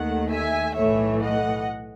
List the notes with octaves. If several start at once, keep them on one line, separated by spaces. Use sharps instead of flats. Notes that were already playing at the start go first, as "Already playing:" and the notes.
Already playing: D#2 D#3 A3 F#5
E5 G#5
B1 A2 E3 A3 C#5 E5
D#5 F#5